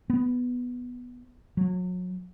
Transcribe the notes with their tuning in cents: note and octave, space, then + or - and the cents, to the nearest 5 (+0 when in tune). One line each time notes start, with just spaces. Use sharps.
B3 +0
F#3 -30